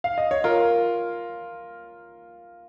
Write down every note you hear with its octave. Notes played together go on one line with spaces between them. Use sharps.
F5
D#5
C#5
F4 A#4